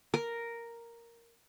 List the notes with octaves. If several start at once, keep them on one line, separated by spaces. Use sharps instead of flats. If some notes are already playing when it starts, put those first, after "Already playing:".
A#4